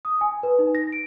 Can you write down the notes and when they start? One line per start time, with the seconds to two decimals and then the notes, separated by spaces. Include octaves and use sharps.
0.05 D#6
0.21 G#5
0.43 B4
0.59 D#4
0.75 A#6
0.92 D7